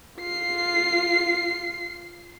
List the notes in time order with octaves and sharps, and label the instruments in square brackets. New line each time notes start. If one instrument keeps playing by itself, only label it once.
[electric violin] F4 C7